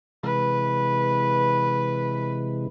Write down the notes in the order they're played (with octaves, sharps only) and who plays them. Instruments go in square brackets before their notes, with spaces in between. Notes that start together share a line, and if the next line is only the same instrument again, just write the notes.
[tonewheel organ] C3 E3 G#3 [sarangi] B4